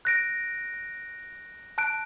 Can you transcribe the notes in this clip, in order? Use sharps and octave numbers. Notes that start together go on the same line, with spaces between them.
F#6 A#6 D7
A5 F#6 D7